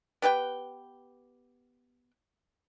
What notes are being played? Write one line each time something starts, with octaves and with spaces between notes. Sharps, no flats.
B3 G4 B4 G5